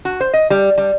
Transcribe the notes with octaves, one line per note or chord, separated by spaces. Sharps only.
F#4
C5
D#5
G3
G3